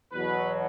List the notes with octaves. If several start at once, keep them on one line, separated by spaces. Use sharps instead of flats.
E2 B2 F#3 B4